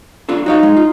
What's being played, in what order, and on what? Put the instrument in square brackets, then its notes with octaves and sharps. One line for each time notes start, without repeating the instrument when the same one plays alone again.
[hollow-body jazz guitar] D4 F4 A4
[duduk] D#4 [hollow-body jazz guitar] F#4 C#5 F5
[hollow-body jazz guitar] G#3
F4